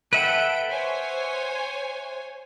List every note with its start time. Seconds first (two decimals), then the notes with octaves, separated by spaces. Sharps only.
0.13 A4 B4 E5 F#5 G5 D7
0.71 C5 C#5 G#5